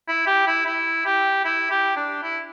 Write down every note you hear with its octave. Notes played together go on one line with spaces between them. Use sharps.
E4
G4
E4
E4
G4
E4
G4
D4
E4